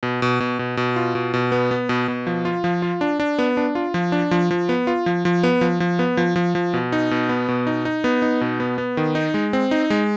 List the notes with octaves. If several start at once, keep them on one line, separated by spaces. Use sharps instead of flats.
B2
B2
B2
B2
B2
F4
B2
B2
B3
B3
B2
B2
F3
F4
F3
F4
D4
D4
B3
D4
F4
F3
D4
F3
F3
B3
F4
F3
F3
B3
F3
F3
B3
F3
F3
F3
B2
D#4
B2
B3
B2
D#4
D#4
B3
D#4
B2
B3
B3
D#3
D#4
G#3
C4
D#4
G#3